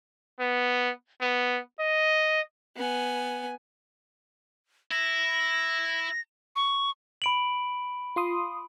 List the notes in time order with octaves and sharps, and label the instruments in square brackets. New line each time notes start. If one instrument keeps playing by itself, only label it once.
[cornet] B3
B3
D#5
[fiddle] B3 G#5
[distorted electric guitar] E4 [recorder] A#6
[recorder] C#6
[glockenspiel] B5 D7 F#7
[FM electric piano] F4 C6 D#6